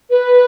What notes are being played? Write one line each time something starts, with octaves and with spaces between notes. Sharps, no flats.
B4